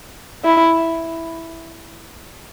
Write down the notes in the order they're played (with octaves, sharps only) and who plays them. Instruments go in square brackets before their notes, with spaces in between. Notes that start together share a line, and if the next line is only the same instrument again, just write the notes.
[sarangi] E4